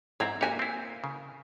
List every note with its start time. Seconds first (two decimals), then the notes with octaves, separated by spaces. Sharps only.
0.20 G#2 C4 E4 A#5
0.41 A#3 F#4 G4 C#5 G#5
0.59 C4 E4
1.04 C#3